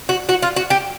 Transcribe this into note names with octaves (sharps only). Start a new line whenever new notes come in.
F#4
F#4
F4
F#4
G4